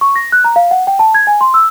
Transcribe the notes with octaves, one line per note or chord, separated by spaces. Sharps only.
C#6
A#6
F#6
A#5
F5
F#5
G5
A5
G#6
G#5
C6
E6